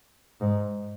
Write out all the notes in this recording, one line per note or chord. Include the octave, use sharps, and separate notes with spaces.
G#2